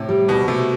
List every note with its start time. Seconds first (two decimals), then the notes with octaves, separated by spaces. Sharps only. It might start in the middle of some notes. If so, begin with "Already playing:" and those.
Already playing: A2 C3
0.09 G3
0.28 D2 B2
0.48 C3 A3